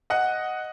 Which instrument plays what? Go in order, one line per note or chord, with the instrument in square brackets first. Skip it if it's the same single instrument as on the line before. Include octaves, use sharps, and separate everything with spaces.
[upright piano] D#5 F#5